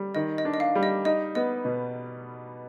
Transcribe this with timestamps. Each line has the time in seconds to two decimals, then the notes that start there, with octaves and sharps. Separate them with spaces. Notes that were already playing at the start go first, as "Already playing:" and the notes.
Already playing: G3
0.15 D#3 D#5
0.38 D#5
0.45 D4
0.54 D#5
0.60 F5
0.75 G3
0.83 D#5
1.05 D#4 D#5
1.35 B3 D#5
1.65 B2